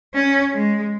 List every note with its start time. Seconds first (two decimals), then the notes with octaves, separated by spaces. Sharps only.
0.15 C#4
0.54 G#3